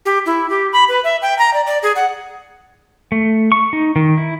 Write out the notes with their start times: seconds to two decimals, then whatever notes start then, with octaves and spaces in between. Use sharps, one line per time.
0.06 G4
0.26 E4
0.50 G4
0.73 B5
0.89 B4
1.04 E5
1.22 G5
1.39 A#5
1.54 D5
1.67 D5
1.83 G#4
1.96 F#5
3.12 A3
3.52 C#6
3.73 D#4
3.96 D#3
4.17 E4